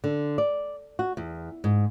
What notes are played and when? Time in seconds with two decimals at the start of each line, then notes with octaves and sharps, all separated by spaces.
0.04 D3
0.38 D5
0.99 F#4
1.17 E2
1.64 G#2